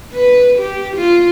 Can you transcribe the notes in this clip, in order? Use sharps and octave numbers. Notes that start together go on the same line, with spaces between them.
B4
G4
F4